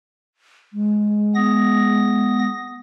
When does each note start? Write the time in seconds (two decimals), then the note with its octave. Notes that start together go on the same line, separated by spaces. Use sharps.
0.73 G#3
1.35 B3 D#6 A#6